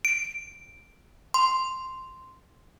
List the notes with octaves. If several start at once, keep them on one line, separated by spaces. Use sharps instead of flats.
D7
C6